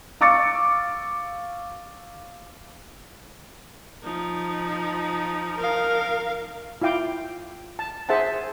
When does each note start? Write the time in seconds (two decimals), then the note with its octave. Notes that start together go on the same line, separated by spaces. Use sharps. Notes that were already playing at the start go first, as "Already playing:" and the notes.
0.21 F5 C#6 D6 E6 A6 C#7
4.03 F3 D#4
5.57 A#4 F5
6.82 E4 F4 F5 G5 D6
7.79 A5
8.09 G#4 C5 E5 F#5 A5